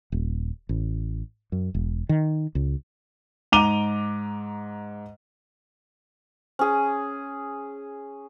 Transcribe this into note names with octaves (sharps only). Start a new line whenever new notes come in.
D#1
A1
F#2
E1
D#3
C#2
G#2 A#5 D6 D#7 F7 G7
C#4 G#4